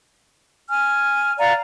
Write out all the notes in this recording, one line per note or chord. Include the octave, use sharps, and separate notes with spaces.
G#5 F6
D5 F5 F#5 A#5